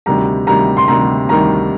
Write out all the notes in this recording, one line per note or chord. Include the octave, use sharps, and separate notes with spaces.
D2 C3 D#3 G3 A#5
D2 C3 D#3 G3 A#5
C6
D2 C3 D#3 G3 A#5
D2 C3 D#3 G3 A#5